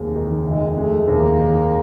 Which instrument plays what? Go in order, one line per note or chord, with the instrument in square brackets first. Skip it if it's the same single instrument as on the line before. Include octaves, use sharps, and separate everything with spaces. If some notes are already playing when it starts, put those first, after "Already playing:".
Already playing: [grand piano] F1 D#2 G#3
D#3
[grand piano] F1 [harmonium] G#3
[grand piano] G#3 [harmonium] A3
[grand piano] D#2 [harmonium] A#3
[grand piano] D#3